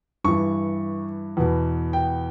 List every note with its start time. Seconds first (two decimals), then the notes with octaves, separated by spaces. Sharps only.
0.24 G2 E3 C#6
1.37 E2 B2
1.93 G5